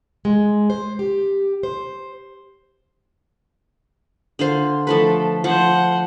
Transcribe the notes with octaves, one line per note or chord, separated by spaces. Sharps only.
G#3
C5
G4
C5
D3 F4 C5
F3 A3 A4 B4
F3 C5 F#5